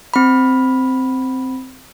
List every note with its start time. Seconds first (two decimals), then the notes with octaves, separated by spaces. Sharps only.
0.14 C4 B5